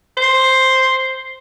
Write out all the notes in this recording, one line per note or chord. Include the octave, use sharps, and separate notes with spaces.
C5